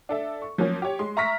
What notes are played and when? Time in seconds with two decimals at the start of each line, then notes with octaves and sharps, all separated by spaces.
0.09 D4 A4 E5
0.42 C#6
0.58 F3 F#3 A#3 C#4
0.82 G4 C#5
0.99 G#3 C6
1.17 E5 A#5 C#6 F6 A#6 B6